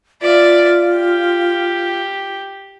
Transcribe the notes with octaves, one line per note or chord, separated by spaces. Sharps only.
F4 D5 E5
G4